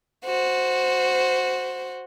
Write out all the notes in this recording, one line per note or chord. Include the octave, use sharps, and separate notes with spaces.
F#4 C5